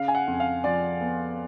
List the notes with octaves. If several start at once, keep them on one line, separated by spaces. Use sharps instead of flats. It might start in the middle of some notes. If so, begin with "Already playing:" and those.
Already playing: C#3 F5
G#5
F#5
F2
F5
F3 D5
B3